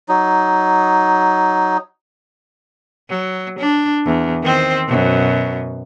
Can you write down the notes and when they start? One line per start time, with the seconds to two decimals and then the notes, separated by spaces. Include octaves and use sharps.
0.09 F#3 D#4
3.09 F#3
3.59 D4
4.06 E2
4.43 D#3 C4 C5
4.87 F#2 B2